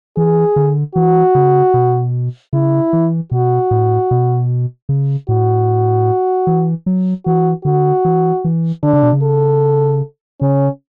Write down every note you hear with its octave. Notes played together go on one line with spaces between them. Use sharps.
E3 G#4
D3
E3 F#4
C#3
B2
C#3 E4
E3
B2 F#4
A2
B2
C#3
A2 F#4
E3
F#3
E3 F#4
D3 F#4
E3
E3
D3 D4
C#3
B2
C#3
A4
C#3 C#4